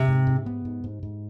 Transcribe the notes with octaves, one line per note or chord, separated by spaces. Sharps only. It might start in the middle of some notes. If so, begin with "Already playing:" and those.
Already playing: C3
G#2
G#2
B3
G#2
G#2
G#2